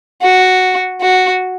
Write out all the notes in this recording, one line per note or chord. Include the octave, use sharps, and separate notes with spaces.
F#4
F#4